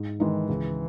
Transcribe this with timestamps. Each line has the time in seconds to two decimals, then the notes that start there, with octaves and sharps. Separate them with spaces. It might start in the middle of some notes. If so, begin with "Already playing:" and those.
Already playing: G#2
0.20 D#3 E3 G#3 D#4
0.49 C#2